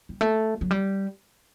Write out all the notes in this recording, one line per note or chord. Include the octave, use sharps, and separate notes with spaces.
G3
A3
F#3
G3